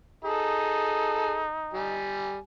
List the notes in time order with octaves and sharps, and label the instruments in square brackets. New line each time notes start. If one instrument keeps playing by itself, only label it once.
[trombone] D#4 [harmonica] G#4 A4
[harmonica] G3 G#5